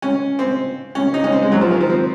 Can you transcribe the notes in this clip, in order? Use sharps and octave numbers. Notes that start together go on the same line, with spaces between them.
C#4
C4
C#4
D#4
C#4
C4
G#3
F#3
F3
D#3
F3
C4